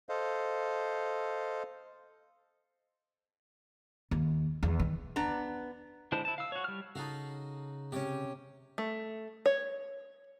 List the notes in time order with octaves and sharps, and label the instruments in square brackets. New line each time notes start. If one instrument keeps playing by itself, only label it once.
[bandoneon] A4 C5 D#5 F5
[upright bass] D#2
E2
D#3
[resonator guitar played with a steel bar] B3 D4 A#5
[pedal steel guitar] D3 G#3 E4 C5 A5
E4 A5
F5 E6
F#4 C#5
G3 F6
[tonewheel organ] C#3 [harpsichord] D#4 F#4 [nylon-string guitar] A4 F5 A5
[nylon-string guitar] C3 C#4 [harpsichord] G4 C#5
[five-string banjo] A3
C#5